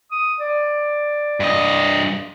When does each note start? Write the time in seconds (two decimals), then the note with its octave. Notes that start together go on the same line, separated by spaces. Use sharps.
0.12 D#6
0.40 D5
1.40 G2 D#5